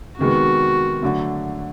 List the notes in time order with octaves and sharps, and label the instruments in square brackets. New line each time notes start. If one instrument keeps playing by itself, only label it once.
[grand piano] C3 D#3 G#3 B3 [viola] F#4
[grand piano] D3 F#3 A3